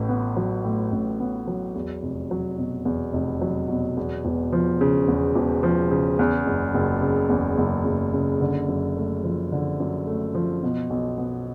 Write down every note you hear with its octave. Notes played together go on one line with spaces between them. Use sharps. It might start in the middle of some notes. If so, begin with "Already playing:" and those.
Already playing: A1 A2
B3
F#3
A2
A1
B3
F#3
E2
F1
F#3
B2
E2
F1
F#3
B2
E2
E1
F3
C#3
E2
E1
F3
C#3
E2
F#1
F#1
C#3
E2
F#1
F#1
C#3
D3
F#2
A3
F3
D3
F#2
A3
F3
B2
B1
B3